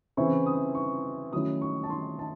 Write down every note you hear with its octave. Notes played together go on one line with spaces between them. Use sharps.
C#3 E3 C4 E4 C#6
D#6
C#6
D#3 F#3 A3 C#4 E4 D#6
C#6
A5
C6
A5